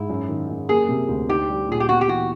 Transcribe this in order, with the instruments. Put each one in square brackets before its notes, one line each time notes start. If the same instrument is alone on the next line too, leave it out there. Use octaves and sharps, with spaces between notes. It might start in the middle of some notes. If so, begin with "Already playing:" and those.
Already playing: [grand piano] G#2 [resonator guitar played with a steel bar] E4
[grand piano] F#2
D#3
F#2
[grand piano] A#3 [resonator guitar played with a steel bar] G#4
[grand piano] C3
D2
[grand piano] D#4 [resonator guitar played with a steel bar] G4
[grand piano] G3
[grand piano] A#2 [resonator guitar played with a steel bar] G#4
[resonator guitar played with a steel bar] G4
[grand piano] B3 [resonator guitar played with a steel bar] F#4
[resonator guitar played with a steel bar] G4
[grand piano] E3 [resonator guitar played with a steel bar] F#4